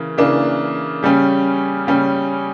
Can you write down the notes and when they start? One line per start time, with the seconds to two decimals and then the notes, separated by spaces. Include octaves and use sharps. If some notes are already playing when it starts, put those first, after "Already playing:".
Already playing: C#3 E3 A#3
0.18 C#3 E3 A#3 D4
1.03 C#3 G3 C#4
1.87 C#3 G3 C#4